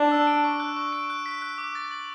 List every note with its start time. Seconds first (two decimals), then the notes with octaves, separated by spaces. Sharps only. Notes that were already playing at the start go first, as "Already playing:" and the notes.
Already playing: D4
0.11 E6
0.27 D7
0.44 C#6
0.60 F#6
0.76 C#6
0.93 D7
1.10 F#6
1.26 B6
1.42 F#6
1.58 D6
1.75 A6
1.91 F#7